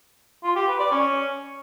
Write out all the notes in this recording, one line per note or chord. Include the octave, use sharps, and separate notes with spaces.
F4
G4
B4
D5
C#4